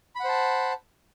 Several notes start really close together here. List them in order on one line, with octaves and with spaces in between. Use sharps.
B5 F#5 C5 A5